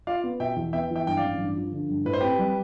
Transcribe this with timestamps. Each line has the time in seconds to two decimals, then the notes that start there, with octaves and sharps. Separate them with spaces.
0.07 F4 D5 F5
0.24 B3
0.40 B2 E5 G5
0.56 E2
0.73 B3 E5 G5
0.90 E3
0.95 E5 G5
1.07 G2 G5
1.17 D5 F5
1.23 A1
1.39 G2
1.56 F3
1.73 D3
1.89 G2
2.05 A2 B4
2.13 C5
2.20 C4 G4 B4
2.39 G3